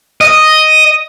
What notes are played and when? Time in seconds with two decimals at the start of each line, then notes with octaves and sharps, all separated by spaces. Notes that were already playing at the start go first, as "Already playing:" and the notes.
0.21 D#5